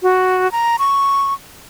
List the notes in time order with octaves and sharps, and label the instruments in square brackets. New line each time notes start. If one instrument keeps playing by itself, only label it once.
[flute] F#4
A#5
C#6